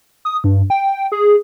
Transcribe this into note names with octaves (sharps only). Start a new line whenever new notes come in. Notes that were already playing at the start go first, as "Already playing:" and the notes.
D#6
G2
G5
G#4